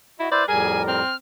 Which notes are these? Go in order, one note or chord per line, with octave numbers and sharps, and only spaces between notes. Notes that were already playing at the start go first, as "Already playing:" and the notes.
E4 F#4 D#5
E4 B4 C5 D5
F2 A2 G3 G#4 A#4 G#5
C4 F6